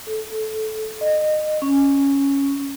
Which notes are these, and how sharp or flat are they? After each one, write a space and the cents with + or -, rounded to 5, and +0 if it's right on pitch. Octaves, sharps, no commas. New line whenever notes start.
A4 -15
D#5 -25
C#4 +0